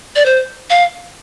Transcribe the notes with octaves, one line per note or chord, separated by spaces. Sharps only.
D5
C5
F5